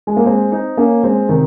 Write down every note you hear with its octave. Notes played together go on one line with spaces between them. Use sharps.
G#3
A#3
G#3 C4
C4 D#4
A#3 C#4
G#3 C4
C3 D#3